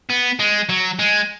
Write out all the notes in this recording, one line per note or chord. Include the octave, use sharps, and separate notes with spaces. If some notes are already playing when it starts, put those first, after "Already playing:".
B3
G#3
F#3
G#3